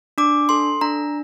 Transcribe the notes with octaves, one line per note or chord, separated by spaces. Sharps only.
D4 D6
A4 C6
D4 A#5